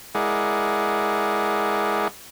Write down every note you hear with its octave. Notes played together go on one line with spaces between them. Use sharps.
G#3 E4 G#4 A#4 D5 F#5